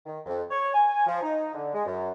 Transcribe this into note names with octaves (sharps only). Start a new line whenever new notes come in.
D#3
F2
C#5
G#5
F3
D#4
D3
G#3
F#2